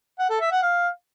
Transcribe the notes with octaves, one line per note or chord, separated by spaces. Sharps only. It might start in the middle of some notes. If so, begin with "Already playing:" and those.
F#5
A4
E5
F#5
F5